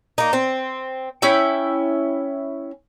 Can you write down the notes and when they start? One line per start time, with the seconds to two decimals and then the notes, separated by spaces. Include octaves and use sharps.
0.18 A#3 D#4
0.33 C4
1.22 C#4 E4 G5